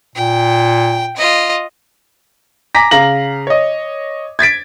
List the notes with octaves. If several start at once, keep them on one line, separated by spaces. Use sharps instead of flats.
A#2 G5
F4 D#5
G#5 A#5 D6 A#6 B6
C#3 F5 A#5 A#6 F#7
C#5 D#5
G#6 A6 B6 D7